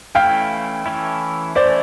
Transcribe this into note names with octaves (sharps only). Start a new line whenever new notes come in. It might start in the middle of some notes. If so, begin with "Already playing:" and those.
E3 A3 C#4 E4 F5 G5
E3 A3 C#4 E4
E3 A3 C#4 E4 C5 D5